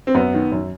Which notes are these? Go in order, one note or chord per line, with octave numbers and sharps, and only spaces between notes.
C4
F#2 B3
D#3
F#2